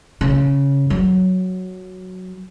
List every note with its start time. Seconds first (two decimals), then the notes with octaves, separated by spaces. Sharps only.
0.21 C#3
0.90 F#3